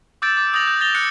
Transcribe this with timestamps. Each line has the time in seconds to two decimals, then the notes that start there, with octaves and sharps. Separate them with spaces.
0.22 D6 E6 G6 A6 D7
0.37 D6 A6
0.53 D#6 G6 A6 A#6 F7 F#7
0.67 G6
0.81 D#6 A6 A#6 F7 G7
0.95 F#6 G6 C#7